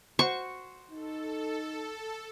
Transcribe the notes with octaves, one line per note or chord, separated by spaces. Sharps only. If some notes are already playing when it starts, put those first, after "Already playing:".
F#4 C5 C#6
D#4 A4